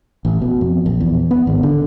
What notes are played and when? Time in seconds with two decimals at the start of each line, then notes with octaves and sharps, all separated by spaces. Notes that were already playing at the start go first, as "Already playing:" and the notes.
0.25 A1
0.42 B2
0.61 F2
0.86 A#1
1.00 E2
1.31 B3
1.47 G#1
1.63 D3